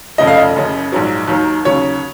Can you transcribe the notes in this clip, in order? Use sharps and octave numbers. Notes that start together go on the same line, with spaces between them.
F1 F2 C#3 D#5
F5
D#5
F#1 F#2 C#3
A#1 G#2 F#3
D#2 D#3 F#3
D#2 C#3 F#3 C#5